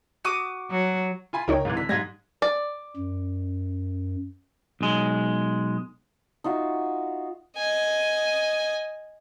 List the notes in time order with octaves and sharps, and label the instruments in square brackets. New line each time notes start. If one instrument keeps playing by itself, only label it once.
[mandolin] F#4 D6 D#6
[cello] F#3
[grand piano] F4 G#5 B5
[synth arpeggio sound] C#2 D#4 C#5 [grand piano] A#4 G5
[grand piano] G#2 C3 E3
D3 B6
[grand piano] G#2 G#6 A#6 [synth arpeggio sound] G3
[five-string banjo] D5
[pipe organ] F#2
[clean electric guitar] B1 G#3
[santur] D#4 F4 F#4 E5
[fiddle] D#5 G#5